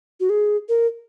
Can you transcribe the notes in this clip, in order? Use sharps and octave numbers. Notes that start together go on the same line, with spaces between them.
F#4
G#4
A#4